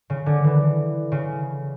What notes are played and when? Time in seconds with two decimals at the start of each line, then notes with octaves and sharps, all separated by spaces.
0.10 C#3
0.26 D3
0.44 E3
1.12 C#3